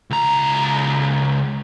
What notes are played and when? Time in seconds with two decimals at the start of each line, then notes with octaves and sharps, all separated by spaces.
0.10 C#2 A#5